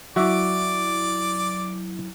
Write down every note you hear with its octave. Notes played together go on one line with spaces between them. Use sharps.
F#3 E4 F#4 D5 E5 D6